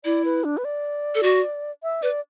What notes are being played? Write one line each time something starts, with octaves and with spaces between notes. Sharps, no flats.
E4 D5
B4
D4
B4
D5
A4
F#4
E5
B4 D5